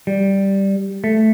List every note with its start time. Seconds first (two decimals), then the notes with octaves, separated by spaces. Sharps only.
0.07 G3
1.04 A3